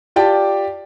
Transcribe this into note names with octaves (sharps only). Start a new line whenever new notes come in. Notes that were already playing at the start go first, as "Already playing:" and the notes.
F4 G4 D5 G5 A5